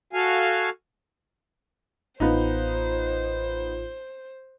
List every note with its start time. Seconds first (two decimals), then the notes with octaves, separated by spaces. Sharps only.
0.13 F#4 A4 F5 G#5
2.20 A1 B3 D#4 F4 C5